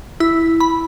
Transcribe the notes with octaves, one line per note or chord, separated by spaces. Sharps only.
E4
B5